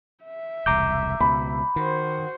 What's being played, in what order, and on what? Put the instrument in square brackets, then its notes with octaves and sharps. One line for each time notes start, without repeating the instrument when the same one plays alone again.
[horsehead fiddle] E5
[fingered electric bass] E1 C2 [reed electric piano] A#5 D6 G6
[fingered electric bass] C#2 B2 [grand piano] B5
[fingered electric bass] D#3 [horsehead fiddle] F#4 C5